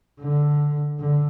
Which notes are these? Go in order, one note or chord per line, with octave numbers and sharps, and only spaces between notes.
D3
D3